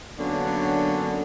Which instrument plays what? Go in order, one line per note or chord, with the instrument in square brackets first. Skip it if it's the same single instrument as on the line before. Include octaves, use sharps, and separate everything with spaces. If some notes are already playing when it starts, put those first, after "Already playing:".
[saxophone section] D3 F#3 A#3 B3 C#4 D4